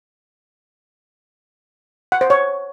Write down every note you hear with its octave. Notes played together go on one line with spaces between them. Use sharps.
F#5
C5
C#5